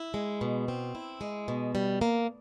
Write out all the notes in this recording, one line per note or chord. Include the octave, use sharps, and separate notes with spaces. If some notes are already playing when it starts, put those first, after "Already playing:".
Already playing: E4
G#3
B2
C4
E4
G#3
B2
G3
A#3